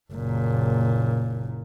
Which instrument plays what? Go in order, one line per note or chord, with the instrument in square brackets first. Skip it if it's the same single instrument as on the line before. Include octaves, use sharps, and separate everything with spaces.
[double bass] F#1 A#2